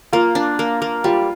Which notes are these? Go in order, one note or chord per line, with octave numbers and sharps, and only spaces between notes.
A#3 F4
D4
A#3
A#3
G3 F4